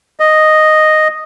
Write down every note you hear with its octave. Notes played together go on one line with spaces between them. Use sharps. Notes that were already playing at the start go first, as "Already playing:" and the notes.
D#5